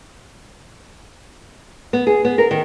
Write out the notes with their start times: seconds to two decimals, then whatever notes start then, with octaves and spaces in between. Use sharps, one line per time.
1.93 B3
2.07 G#4
2.25 B3
2.38 A#4
2.51 D#3